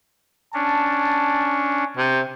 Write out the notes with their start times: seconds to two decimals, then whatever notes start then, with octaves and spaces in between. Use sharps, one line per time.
0.54 C#4 D4 A5
1.97 C3